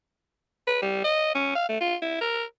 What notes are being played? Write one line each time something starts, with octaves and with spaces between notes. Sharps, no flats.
B4
G3
D#5
C#4
F5
A3
F4
E4
A#4